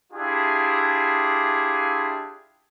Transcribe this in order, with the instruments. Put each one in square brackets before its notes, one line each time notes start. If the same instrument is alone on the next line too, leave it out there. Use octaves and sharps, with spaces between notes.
[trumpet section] D4 E4 F4 G4 G#4